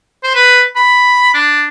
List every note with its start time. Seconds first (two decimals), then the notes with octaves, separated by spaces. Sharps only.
0.24 C5
0.35 B4
0.76 B5
1.34 D4